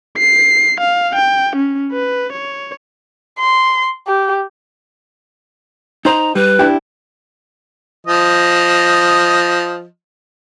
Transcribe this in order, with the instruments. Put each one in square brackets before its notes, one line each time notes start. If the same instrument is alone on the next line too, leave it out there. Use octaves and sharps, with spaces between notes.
[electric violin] C7
F5
G5
C#4
B4
C#5
[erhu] C6
G4
[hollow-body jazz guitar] D#4 C5 [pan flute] A#5
[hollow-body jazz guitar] G3 [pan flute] B4
[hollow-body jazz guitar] D4 E4 G4
[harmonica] F3 D#5